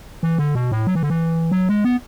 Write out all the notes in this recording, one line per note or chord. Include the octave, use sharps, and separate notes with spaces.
E3
D3
B2
A2
F#3
E3
D3
E3
F#3
G#3
B3